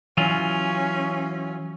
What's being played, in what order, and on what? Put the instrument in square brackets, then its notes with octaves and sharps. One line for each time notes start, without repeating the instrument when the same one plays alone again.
[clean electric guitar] E3 F#3 F4 [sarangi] C#4